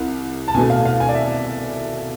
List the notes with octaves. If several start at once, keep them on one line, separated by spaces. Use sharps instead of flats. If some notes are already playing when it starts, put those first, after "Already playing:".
Already playing: C2
A5
C2 B2 A3 G#5
F5
F5
G#5
D5
E5